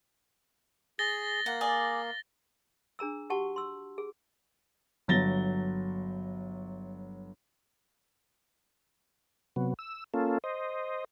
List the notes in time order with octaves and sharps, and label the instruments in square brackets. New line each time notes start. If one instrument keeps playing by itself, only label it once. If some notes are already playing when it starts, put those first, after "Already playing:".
[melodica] G#4 [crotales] A6 A#6 G7
[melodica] A#3 [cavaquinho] F#5
[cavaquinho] G#4 D5 G#5
[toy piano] D4 G#4 A#5 E6
F#4 G4 F#5 A5 C#6
C6 E6
G#4
[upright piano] G1 F#3 A6 A#6 G7
[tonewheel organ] C3 F#3 B3
E6
A#3 C#4 F4 A4
C5 D#5